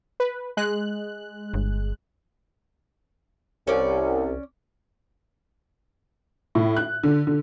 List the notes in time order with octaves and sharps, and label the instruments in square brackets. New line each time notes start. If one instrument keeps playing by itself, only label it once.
[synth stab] B4
G#3 F#6
[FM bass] G1
[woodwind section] C2 [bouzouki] C#4 D5
[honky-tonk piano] A2
F#6
D3
D3